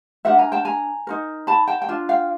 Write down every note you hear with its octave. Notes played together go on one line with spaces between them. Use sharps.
D4 F#4 A#4 E5 F#5
G#5 A#5
G5 A5
G#5 A#5
D#4 F#4 A#4
A5 B5
G5 A5
G5
D4 F4
F5 G5